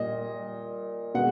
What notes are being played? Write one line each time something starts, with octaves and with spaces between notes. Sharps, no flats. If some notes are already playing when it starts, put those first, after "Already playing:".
Already playing: A#2 G3 D#5
B2 G#3 F#5